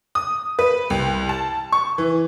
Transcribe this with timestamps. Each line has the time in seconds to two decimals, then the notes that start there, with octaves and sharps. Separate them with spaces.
0.15 D#6
0.59 B4
0.90 C2
1.29 A5
1.72 C#6
1.98 E3